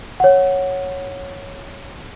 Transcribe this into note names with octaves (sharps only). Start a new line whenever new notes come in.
C#5 F#5